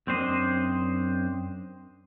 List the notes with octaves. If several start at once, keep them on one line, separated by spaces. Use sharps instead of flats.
F#2 C4 D4 C5 D#5